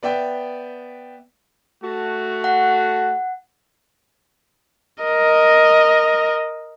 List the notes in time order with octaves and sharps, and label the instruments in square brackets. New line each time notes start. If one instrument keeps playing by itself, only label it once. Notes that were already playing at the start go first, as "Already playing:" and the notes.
[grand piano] B3 D5 E5 G5
[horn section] A3 F#4
[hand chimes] F#5
[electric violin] A#4 D#5